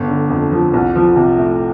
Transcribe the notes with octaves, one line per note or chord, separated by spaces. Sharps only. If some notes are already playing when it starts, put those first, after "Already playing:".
Already playing: G1
D3
F2
F3
C2
F3
C3
A3